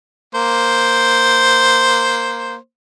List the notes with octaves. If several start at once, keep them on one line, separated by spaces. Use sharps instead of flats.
A#3 C5